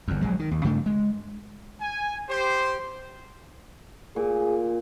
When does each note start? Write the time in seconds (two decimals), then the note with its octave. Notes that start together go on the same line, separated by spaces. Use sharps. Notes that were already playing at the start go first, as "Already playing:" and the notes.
0.08 G1 E2
0.22 A#1 F#3 G#3
0.39 D#3
0.51 D#2
0.64 G2 C#3 A3 D4
0.86 G#3
1.80 G#5
2.29 G4 C5
4.16 A#2 G#4